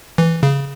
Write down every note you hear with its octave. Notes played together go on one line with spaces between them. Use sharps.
E3
C#3